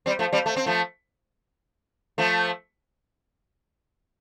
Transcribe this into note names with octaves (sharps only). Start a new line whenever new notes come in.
G3 C4
F3 A3
G3 C4
A3
C4
F3 A3
F3 A3